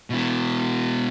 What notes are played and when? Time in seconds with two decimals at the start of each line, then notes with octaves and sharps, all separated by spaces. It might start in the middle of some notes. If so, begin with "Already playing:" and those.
0.10 B2 E4